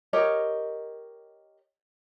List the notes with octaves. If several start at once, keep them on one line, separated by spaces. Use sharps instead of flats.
G4 A#4 C#5 D#5